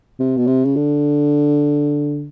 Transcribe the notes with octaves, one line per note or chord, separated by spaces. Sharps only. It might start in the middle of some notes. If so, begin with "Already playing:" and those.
C3
B2
C3
C#3
D3